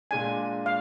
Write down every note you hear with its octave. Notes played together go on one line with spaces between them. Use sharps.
A#2 G#3 D4 G#5
F5